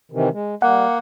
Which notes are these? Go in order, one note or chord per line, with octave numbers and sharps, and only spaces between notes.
C3 D#3 E3
G#3
G3 A#3 F#5